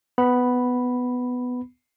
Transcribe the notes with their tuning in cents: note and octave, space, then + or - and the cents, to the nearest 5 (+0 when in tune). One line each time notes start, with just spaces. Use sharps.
B3 +10 B5 +0